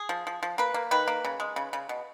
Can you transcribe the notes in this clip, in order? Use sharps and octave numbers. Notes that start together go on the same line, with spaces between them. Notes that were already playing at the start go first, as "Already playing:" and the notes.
Already playing: G#4
F3
F3
F3
A#3 B4
A#3
D#3 B4
A#3
C#3
G#3
C#3
C#3
B2